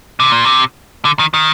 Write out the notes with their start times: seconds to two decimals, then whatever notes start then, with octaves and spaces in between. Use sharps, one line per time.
0.20 C3
0.32 A#2
0.45 C3
1.05 D3
1.19 D#3
1.34 D#3